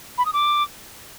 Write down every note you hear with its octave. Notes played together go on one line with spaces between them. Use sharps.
B5
D#6
D6